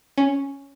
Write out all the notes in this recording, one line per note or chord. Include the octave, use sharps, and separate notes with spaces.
C#4